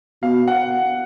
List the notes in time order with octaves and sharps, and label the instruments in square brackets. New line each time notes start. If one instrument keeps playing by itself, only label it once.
[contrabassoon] B2 [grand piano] F5
[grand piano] F#5